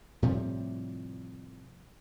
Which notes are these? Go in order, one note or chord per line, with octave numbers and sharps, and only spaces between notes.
A2 C3 F3 G3